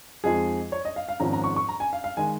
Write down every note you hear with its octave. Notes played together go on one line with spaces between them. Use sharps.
F2 F3 G#3 D#4 G#4
C#5
D#5
F5
F5
G#1 G#2 F3 C#4 A#5
A#5
C#6
C#6
A#5
G#5
F5
F5
D#3 G#3 G#5